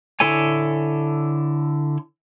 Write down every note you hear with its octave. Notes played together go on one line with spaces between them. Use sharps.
D3 E4 A4 C#5 G#5